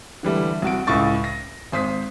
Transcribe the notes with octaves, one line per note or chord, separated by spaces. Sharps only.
D3 E3 G3 A3
C2 F#4 D7
C#2 A2 C#6 A6
A#6
G#1 C5 D#6 B6